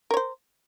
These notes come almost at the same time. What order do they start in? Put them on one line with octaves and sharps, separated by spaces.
A#4 C#5 C5